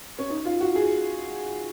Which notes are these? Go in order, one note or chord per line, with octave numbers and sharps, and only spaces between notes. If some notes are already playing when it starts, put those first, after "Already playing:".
C#4
D#4
F4
F#4
G#4